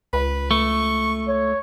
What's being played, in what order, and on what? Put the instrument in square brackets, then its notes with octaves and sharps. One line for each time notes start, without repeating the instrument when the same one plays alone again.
[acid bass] C#2 [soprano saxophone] B4
[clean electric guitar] A3 [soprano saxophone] C#6
[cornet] C#5